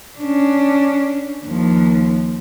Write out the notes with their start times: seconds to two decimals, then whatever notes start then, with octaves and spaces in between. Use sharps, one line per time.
0.19 C#4 D4
1.46 D#2 F3